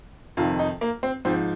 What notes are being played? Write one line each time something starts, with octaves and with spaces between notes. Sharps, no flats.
F2 C3 D#3 F4
D#4
A#3
C4
G#2 F3 C4